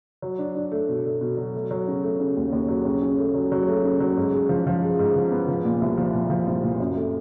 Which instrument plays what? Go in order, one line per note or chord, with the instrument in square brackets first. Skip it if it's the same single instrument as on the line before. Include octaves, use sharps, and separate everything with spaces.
[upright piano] F#3
D4
D4
A3
B2
A3
B2
F#3
A3
F#3
C#3
A3
C#3
D#2
D#2
F#3
C#3
C#3
A3
F#3
F#3
A3
C#3
F#3
G#2
G#3
F3
F3
G#3
G#2
F3
B3
F3
A#2
C2
F3
A#2
F3
C2
A#2
F#2
A3